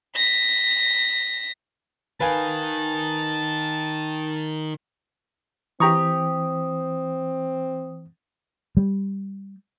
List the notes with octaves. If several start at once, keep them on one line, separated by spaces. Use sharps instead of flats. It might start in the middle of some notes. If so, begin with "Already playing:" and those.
A#6 B6
D#3 B4 F5 G#5 A5
E3 C4 G4 A#5 C#6 D#6
G3